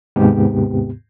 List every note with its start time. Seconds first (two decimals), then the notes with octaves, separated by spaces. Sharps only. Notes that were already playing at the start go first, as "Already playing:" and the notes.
0.16 D#2 G#2 C3 B3 G4